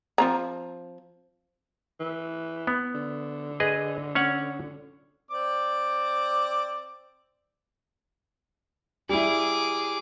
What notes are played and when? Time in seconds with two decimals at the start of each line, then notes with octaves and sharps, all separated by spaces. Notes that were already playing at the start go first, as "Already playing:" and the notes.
0.18 F3 C4 A#5
2.00 E3
2.67 B3
2.94 D3
3.60 G#4 B4 D#5
4.15 C#4 C#5 F#5
5.31 C4 D5 D6
9.09 G3 E4 G#4 D6